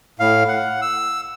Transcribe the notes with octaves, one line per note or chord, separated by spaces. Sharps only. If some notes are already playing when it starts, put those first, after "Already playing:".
A2 F5
F#5
E6